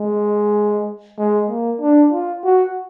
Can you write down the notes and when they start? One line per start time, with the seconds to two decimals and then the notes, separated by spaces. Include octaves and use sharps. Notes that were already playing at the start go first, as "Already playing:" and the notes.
Already playing: G#3
1.18 G#3
1.50 A#3
1.81 D4
2.12 F4
2.45 F#4